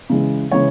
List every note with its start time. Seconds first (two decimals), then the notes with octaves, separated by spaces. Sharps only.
0.10 C#3 E3 G#3
0.51 C#3 E3 G#3 C#5